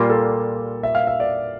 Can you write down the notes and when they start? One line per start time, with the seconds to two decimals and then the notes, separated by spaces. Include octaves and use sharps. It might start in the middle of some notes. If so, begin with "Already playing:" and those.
Already playing: A#2 G3 A#3 F4 G4
0.10 A4
0.83 E5
0.95 F5
1.07 E5
1.20 D5